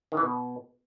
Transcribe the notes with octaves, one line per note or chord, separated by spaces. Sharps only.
D#3
E3
B2